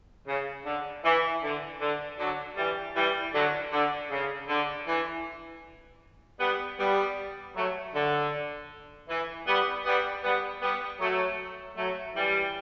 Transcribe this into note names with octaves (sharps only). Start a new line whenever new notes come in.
C#3
D3
E3
D3
D3
D3 F#3
E3 G3
E3 G3
D3 F#3
D3
C#3
D3
E3
G3 B3
G3 B3
F#3 A3
D3
E3
G3 B3
G3 B3
G3 B3
G3 B3
F#3 A3
F#3 A3
E3 G3